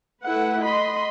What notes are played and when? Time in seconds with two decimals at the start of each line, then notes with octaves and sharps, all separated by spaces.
0.23 A3 E4 B4 F#5
0.61 D#5 B5 C6